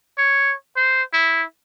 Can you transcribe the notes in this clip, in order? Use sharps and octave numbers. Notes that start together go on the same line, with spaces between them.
C#5
C5
E4